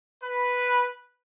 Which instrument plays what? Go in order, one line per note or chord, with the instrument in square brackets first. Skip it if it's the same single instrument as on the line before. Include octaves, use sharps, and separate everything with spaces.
[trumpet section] B4